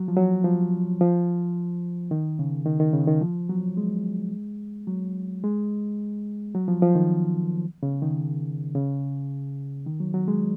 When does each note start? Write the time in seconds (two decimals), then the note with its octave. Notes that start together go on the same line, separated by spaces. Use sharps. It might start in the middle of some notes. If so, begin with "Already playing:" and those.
Already playing: F#3
0.08 F3
0.16 F#3
0.44 F3
1.01 F3
2.11 D#3
2.39 C#3
2.66 D#3
2.80 D#3
2.94 C#3
3.08 D#3
3.21 F3
3.49 F#3
3.77 G#3
4.87 F#3
5.44 G#3
6.55 F#3
6.68 F3
6.82 F3
6.95 D#3
7.83 C#3
8.02 D#3
8.75 C#3
9.87 D#3
10.00 F#3
10.14 F#3
10.28 G#3